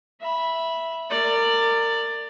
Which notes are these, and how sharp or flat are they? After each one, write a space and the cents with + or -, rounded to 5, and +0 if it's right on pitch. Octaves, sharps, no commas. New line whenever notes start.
E5 +0 B5 -15
A#4 -25 D5 +10